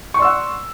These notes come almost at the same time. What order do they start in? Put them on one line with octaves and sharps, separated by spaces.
C#6 C6 D5 E6 F#5